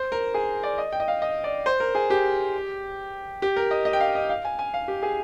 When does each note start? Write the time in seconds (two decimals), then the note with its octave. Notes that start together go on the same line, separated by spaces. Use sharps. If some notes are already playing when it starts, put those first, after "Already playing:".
Already playing: C5
0.12 A#4
0.34 G#4
0.63 D5
0.78 D#5
0.93 G5
1.00 D#5
1.08 F5
1.22 D#5
1.44 D5
1.66 C5
1.80 A#4
1.95 G#4
2.10 G4
3.42 G4
3.56 A#4
3.71 D#5
3.85 D#5
3.93 G5
4.00 F5
4.15 D#5
4.29 F5
4.45 G#5
4.59 G#5
4.74 F5
4.88 G4
5.03 G#4